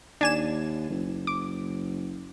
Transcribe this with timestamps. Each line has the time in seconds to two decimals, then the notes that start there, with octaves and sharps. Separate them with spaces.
0.21 D#2 D4 G#5 E7
0.90 F#1
1.27 D6